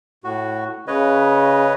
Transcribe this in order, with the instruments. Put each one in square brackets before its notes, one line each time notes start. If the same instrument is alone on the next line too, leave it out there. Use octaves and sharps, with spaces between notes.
[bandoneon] A2 F#4
[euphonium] C#3 [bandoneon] B4 C#5 D#5